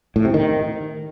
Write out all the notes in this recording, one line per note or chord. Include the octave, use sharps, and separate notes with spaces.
A2
C3
D#3